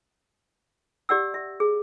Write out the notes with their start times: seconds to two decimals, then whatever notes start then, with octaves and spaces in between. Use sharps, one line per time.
1.09 G4 D5 F#5 E6
1.34 E5
1.60 G#4